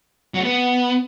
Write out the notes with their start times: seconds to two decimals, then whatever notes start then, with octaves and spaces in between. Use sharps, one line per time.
0.34 F#3
0.39 A3
0.44 B3